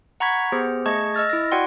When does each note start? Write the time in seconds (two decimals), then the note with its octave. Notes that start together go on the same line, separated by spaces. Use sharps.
0.20 F#5 A#5 B5 C#6 G#6 B6
0.52 B3 G4 G#4 C5
0.86 A3 G#4 D#5 A5 C#6 G#6
1.14 D#5 E6 F6 A6
1.29 E4 A#6
1.52 F#4 D5 F#5 G5 C6